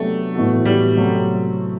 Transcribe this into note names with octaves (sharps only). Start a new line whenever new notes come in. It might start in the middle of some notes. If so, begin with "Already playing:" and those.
Already playing: C3 F#3 A3 B3 D4 G4
A2 E3 B3 F#4 A4
G3
C3 F#3 A3 C4